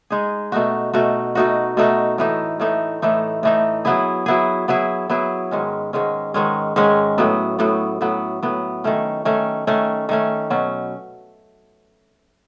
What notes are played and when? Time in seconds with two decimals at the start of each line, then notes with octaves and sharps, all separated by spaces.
0.10 G#3 D#4 G#4
0.52 B2 A3 D#4 F#4
0.94 B2 A3 D#4 F#4
1.35 B2 A3 D#4 F#4
1.77 B2 A3 D#4 F#4
2.18 A2 E3 A3 D#4
2.60 A2 E3 A3 D#4
3.02 A2 E3 A3 D#4
3.43 A2 E3 A3 D#4
3.85 F#3 B3 E4 G#4
4.26 F#3 B3 E4 G#4
4.68 F#3 B3 E4 G#4
5.10 F#3 B3 E4 G#4
5.51 G#2 D#3 G#3 C#4
5.93 G#2 D#3 G#3 C#4
6.34 G#2 D#3 G#3 C#4
6.76 G#2 D#3 G#3 C#4
7.18 A2 F#3 B3
7.59 A2 F#3 B3
8.01 A2 F#3 B3
8.43 A2 F#3 B3
8.84 D#3 A3 C#4
9.25 D#3 A3 C#4
9.67 D#3 A3 C#4
10.09 D#3 A3 C#4
10.50 B2 F#3 C#4